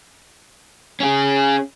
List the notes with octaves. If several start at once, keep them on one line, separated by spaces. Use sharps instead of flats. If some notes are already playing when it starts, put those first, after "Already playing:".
C#4 G#4